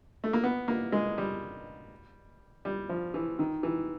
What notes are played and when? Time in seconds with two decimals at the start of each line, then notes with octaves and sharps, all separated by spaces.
0.24 A3
0.33 A#3
0.44 B3
0.68 A#3
0.92 G#3
1.18 G3
2.65 G3
2.89 F3
3.14 E3
3.39 D#3
3.63 E3